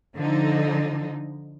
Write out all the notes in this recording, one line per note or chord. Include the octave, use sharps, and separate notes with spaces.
D3 F3 D#4